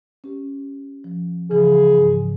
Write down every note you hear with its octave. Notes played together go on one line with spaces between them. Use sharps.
C#4 G4
F3
C#3 E3 F3 G#4
G#2